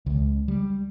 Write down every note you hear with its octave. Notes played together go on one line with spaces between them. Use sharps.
C#2
G3